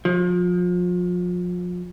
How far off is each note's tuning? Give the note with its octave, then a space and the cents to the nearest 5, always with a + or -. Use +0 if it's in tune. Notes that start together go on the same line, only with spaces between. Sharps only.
F3 +35